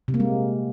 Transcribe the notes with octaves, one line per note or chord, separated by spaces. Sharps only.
C3
A#3
G#3